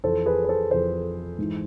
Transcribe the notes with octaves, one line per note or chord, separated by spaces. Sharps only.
F2 E3 A4 C5
G#4 B4
B4
A4 C5
F2 E3 A4 C5
G#2 E3